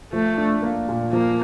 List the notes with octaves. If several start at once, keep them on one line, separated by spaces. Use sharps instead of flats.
F3 A3
D4
A#3
A#2
F3 A#3